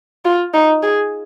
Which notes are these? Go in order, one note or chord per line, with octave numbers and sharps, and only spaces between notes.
F4
D#4
G#4